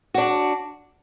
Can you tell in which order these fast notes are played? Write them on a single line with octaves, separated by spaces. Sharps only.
F#4 D4 D5